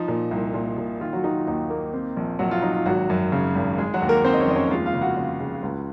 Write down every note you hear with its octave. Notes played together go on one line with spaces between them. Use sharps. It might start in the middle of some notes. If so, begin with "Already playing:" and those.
Already playing: F3 D#4
A#2
C2
A#2
A#2
D#3 F4
F#3 F#4
D#3 D#4
F4
D#2 D#4
A#3
C4
A#1
A#1 F#3 F#4
F4
F#3 D#4
F4
G#1 F#3 F#4
F#2
C#3
G#1
G#3 G#4
F#3 F#4
D#2
A#3 A#4
D#2 C4 C5
D#5
C#4 C#5
F1 D#5
C#4 C#5
G#3 F4 F5
F4 F5
C#3
F#4 F#5
C#3
C#3
C#2